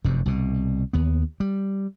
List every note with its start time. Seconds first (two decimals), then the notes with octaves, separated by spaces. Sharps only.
0.04 F1 F#2 C3
0.26 C2 B2
0.93 D#2 B3
1.40 G3